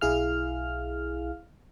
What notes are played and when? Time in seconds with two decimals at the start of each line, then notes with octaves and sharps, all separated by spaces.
0.01 B1 E4 G#4 F5 F6